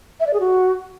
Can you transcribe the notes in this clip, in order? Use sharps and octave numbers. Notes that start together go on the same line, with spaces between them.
E5
D5
G#4
F#4